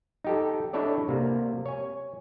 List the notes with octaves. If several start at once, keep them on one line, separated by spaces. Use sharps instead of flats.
D#4 G4 A4
D4 E4 A4 C#5 D5
C3 A#3
C#5 G#5